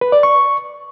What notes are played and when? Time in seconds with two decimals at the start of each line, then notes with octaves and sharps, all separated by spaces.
0.01 B4
0.12 D5
0.23 C#6